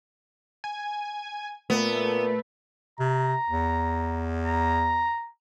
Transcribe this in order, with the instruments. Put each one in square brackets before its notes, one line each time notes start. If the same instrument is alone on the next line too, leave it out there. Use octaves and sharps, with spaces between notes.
[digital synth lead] G#5
[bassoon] A#2 [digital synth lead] A3 [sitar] B3
[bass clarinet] C3 [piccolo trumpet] A#5
[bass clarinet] E2
[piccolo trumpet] A#5